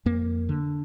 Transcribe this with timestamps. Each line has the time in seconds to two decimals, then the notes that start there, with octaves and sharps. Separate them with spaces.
0.06 F2 A#3
0.49 D3